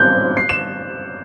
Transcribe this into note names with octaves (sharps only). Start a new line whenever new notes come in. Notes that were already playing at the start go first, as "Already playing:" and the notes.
Already playing: F#6 G6
C7
E7